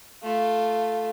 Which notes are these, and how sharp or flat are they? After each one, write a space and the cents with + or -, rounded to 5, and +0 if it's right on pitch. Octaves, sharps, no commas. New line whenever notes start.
A3 +0 F4 +0